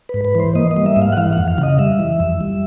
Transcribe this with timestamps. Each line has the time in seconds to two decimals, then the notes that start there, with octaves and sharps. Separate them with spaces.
0.09 G#2 B4
0.25 B4
0.35 E3 C5
0.55 A#3 D#5
0.71 D#5
0.76 G3
0.86 E5
0.96 G#2
1.02 F5
1.12 F#5
1.17 E3 F5
1.33 F2 F#5
1.48 F5
1.58 C#3 D#5
1.79 G3 E5
2.00 E3
2.20 F2
2.41 G3